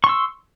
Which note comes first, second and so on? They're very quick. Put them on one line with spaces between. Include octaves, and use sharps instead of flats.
C#6 C6 E6